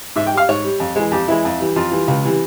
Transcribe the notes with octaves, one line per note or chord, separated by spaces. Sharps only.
G#2 E5
G5
G3 F5
G#2 C#5
G3
F2
E3 G#3
F2 G4
E3 G#3 E4
F2
E3 G3
F2 F4
E3 G3
C#2
C3 E3 G3